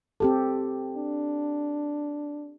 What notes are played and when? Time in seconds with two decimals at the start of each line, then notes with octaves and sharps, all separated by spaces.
0.20 C4 G4 A4
0.97 D4